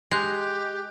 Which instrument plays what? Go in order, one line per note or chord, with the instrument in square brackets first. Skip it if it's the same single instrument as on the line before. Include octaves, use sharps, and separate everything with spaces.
[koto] G#3 [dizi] G4 [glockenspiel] F#6 G6 F7